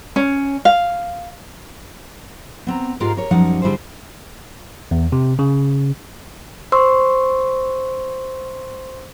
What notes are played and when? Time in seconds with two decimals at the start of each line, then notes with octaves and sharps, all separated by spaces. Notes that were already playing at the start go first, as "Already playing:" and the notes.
0.16 C#4
0.65 F5
2.67 B3 C4 A#5
3.00 G#2 G#3 F4 G4 A#4
3.17 A#4 C#5
3.31 F#2 F3 G3 D#4 F#5
3.62 D3 G3 E4 G#4 C5
4.91 E2
5.12 C3
5.39 C#3
6.72 C5 C6 C#6 E6